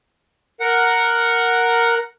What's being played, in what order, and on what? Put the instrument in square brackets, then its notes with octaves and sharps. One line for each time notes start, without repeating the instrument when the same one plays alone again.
[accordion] A#4 F#5